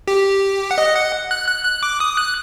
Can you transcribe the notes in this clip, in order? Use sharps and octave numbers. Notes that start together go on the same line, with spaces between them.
G4
F#5
D#5
F#5
F#6
F#6
F#6
D6
D#6
F#6